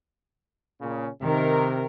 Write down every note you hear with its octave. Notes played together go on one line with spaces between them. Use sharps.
A#2 C#3
C3 D#3 A#4